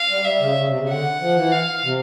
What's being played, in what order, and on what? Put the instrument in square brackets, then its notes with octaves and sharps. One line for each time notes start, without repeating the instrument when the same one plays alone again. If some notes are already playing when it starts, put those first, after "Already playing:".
Already playing: [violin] F5
[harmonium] G3
[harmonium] G3 [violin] E5
[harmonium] C#3
C#3
C3
C#3
[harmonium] D3 [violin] F#5
[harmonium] F3
E3
[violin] F5
[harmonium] C3